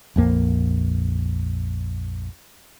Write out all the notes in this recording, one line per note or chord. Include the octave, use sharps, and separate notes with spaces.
A#1 F2 A#3